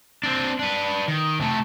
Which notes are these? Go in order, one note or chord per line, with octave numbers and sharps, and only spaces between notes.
C4 D4
D4 B4
D#3
C3 A3